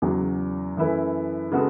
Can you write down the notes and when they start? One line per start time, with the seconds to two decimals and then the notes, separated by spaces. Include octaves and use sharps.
0.02 E2 C#3 F#3
0.77 F#2 E3 A3 E4 B4
1.52 C#3 G#3 B3 F#4 A4